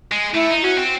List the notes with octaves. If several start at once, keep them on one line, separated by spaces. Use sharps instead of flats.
G#3
A3 E4
D#4
C#4 F#4
C4